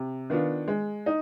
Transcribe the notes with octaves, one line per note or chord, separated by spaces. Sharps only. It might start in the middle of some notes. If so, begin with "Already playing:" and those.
Already playing: C3
D#3 B3 D4 F4
G#3
D#4